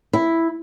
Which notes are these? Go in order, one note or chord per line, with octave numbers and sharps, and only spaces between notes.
E4